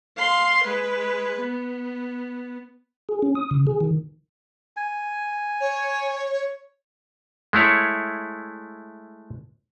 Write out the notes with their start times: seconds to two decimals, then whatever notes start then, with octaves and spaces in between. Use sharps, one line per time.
0.17 F5 C6
0.63 G#3 B4
1.40 B3
3.09 G#4
3.22 C#4
3.35 D#6
3.51 C#3
3.67 G#4
3.81 D#3
4.77 G#5
5.61 C#5
7.53 G#3 A3 E4 C#5